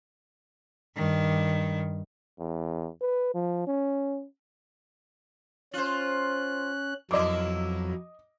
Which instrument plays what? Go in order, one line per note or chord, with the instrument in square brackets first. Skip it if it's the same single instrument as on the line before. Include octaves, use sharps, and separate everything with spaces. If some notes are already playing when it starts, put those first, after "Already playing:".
[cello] G2 D#3
[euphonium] E2
B4
F3
C#4
[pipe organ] C#4 F#6 [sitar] F4 C5
[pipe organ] F2 F#3 [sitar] B2 A#3 E4 [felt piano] D#5 D6